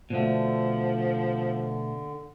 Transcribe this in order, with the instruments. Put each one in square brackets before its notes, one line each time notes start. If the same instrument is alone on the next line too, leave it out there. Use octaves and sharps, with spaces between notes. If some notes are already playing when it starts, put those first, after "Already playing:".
[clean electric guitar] B2 A3 [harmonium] D3 [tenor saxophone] F3